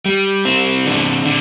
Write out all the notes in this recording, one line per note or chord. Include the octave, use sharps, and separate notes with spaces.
G3
C4
D3
D3